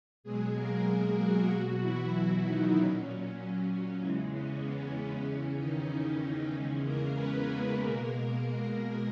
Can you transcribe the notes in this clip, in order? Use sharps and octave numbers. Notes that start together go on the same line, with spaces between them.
B2 F#3 G#3 G#4
A#3 A#4
F#3 F#4
B2 F#3
E3 E4
D#3 D#4
A#2 F#3 C#4
C#4
C#4
E2 C#3 E3 G#3
C#4
B3
C#4
E2 C#3 E3
D#3 D#4
E2 C#3 E3 G#3 C#4
A#3 A#4
B3 B4
A#3 A#4
B2 G#3 A#3 A#4
A#3 A#4
A#3 A#4